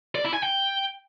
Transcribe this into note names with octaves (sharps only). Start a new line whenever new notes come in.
D5
E4
G#5
G5